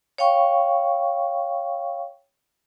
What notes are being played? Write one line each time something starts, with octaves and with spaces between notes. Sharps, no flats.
C#5 F5 G5 C#6